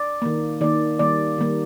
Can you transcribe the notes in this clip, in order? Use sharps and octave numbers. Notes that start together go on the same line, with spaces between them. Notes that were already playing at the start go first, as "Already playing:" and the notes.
Already playing: D5
D#3 A#3
D#3 A#3 D5
D#3 G3 A#3 D5
D#3 G3 A#3